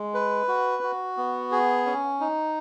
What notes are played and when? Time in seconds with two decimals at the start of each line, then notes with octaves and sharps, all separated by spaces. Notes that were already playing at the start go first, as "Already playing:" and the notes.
Already playing: G#3
0.14 B4
0.48 F#4
0.83 F#4
1.17 B3
1.52 G#4
1.86 C#4
2.20 D#4